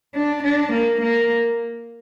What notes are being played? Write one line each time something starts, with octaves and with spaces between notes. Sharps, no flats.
D4
D4
A#3
A#3